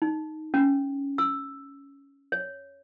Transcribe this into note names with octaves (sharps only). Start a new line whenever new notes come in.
D#4
C#4
E6
C#5